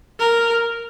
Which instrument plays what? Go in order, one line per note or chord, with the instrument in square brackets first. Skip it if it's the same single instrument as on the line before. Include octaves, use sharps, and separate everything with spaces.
[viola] A#4